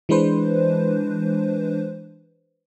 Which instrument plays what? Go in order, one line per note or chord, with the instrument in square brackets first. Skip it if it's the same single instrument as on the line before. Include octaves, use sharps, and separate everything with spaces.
[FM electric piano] E3 G#3 D4 B4 C5